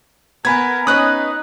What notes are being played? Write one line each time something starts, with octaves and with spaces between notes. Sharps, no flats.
B3 A#4 G#5 B5 G#6
C#4 D#4 B4 D#5 D#6 F#6